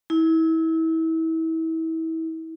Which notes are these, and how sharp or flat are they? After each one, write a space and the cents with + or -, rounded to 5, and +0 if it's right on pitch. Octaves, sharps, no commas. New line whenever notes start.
E4 -30